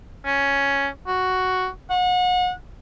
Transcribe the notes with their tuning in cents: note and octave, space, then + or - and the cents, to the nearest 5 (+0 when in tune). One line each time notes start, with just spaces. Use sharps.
C#4 +5
F#4 +5
F#5 -35